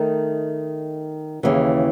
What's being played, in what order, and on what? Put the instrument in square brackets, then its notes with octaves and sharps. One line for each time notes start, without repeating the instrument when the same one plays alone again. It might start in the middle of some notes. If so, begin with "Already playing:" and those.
Already playing: [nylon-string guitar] D#3 A3 D#4
D#2 C#3 E3